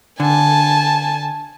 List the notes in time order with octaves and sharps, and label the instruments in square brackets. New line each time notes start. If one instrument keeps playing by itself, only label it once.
[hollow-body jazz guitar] D3 [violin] G#5 A5